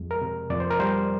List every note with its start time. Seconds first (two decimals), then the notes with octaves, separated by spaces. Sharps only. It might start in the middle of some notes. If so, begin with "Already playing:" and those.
Already playing: F2 G#3
0.11 A#4
0.22 C3
0.50 F2 D5
0.60 C5
0.71 A#4
0.79 G3 C5